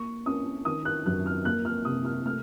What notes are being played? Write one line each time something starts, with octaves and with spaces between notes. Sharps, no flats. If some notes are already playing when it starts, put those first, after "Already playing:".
Already playing: A#3 C#6
C#4 D#6
D#3 D#6
F#6
F#2 F#6
F6
A#3 F#6
F6
C3 D#6
F6
A3 F6